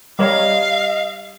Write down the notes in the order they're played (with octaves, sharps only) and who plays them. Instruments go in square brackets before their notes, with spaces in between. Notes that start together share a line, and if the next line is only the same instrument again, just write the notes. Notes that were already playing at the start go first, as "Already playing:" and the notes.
[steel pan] G3 A#4 C#5 [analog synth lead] D#5 [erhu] F5